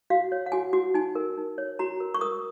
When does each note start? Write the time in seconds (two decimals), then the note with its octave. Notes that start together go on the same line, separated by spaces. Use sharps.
0.10 F#4 F5
0.32 C#5
0.46 F#5
0.52 F#4 G#5
0.73 F#4
0.94 D#4 G#5
1.15 A#4
1.37 D#4
1.58 C#5
1.79 F#4 A#5
2.00 A#4
2.14 C#6
2.21 A#4 D#6